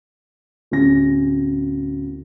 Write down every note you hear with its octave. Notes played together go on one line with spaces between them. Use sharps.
D1 C#4 A#6